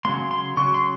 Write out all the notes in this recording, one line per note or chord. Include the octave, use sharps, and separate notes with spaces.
C#3 F#3 A#3 C6
C6
C#3 F#3 C#6
C6